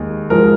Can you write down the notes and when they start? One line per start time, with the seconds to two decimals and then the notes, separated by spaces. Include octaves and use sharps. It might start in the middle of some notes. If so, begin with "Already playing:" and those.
Already playing: D#2 D#3 G#3
0.30 G#2 F3 G#3 A#4